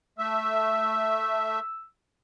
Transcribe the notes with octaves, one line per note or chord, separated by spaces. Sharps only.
A3 E5 E6